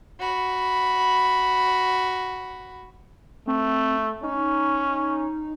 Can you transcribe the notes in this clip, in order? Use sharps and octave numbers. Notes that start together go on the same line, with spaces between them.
F#4 B5
A3 C4
C#4 D#4